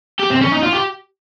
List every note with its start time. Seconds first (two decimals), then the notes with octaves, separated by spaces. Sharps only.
0.19 G4
0.30 C4
0.41 C#4
0.52 D#4
0.63 F4
0.73 G4